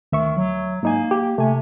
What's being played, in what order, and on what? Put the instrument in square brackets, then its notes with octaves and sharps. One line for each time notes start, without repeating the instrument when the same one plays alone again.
[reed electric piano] D2 E5 C#6 [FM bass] D#3
[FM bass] F#3
[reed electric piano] G#2 D#4 G#5 [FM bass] A#3
[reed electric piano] G4
[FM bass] C3 [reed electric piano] A3 G#5